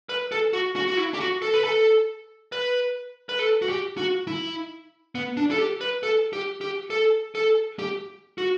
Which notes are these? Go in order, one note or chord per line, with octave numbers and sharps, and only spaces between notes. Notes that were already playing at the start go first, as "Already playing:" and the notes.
B4
A4
F#4
F#4
F#4
E4
G4
F#4
A4
B4
A4
B4
B4
A4
F#4
G4
F#4
E4
B3
D4
A4
G4
B4
A4
G4
G4
A4
A4
G4
F#4